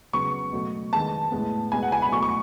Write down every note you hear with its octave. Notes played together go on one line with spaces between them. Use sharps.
C#3 F#3 B3 C#6
B2 F#3 A3
D#3 G#3 B3 A5
A2 G#3 B3
B2 G#3 B3 G#5
F#5
G#5
B5
B2 F#3 A3 C#6
C#6